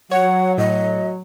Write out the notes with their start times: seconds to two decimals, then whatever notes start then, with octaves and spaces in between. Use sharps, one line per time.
0.11 F#3 C#5 F#5
0.58 A2 D#5